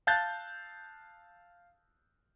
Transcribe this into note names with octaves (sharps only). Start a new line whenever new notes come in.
F5 A5 F#6 G6 A6